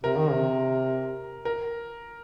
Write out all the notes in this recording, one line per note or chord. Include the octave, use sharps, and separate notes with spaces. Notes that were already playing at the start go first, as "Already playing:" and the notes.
C3 A#4
D#3
C3
A#4